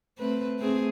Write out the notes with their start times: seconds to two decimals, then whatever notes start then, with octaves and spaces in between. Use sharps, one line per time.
0.18 A3 C4 B4
0.59 A3 C4 G#4